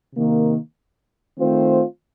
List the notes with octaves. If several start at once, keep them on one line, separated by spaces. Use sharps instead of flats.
C3 D#3 A#3
D#3 A3 C4 F4 C5